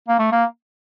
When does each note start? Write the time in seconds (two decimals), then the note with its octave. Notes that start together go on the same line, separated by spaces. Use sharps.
0.08 A#3
0.19 A3
0.32 A#3